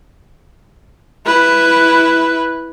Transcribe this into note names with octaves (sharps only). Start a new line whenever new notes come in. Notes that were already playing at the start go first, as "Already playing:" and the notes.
E4 B4